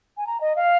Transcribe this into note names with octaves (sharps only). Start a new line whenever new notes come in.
G#5
A#5
D#5
F5